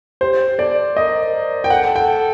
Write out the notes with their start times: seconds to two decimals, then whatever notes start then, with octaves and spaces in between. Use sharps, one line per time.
0.21 G4 C5
0.58 A4 D5
0.96 A#4 D#5
1.34 A#4
1.64 G5
1.70 A4 F#5
1.96 G5